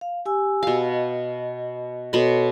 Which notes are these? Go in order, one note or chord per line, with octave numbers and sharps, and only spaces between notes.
F5
G4 G#5 E6
B2 F5
D#5
B2 A4 C#5 B5 C6